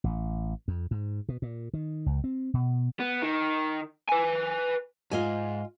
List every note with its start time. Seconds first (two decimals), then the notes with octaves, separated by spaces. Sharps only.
0.04 A1
0.68 F2
0.91 G#2
1.29 B2
1.42 A#2
1.74 D#3
2.06 C#2
2.24 C4
2.54 B2
3.00 B3
3.22 D#3
4.09 B4 G#5
5.11 G#2 F4 D#5 G#5